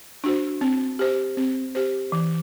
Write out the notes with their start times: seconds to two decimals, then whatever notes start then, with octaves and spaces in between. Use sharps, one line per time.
0.24 D4 F#4 C5
0.61 C4
0.99 G4 C5
1.37 C4
1.75 G4 C5
2.12 E3